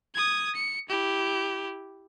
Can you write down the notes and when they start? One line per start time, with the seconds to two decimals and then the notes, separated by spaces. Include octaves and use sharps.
0.15 D#6 G#6
0.55 C#7
0.89 E4 G4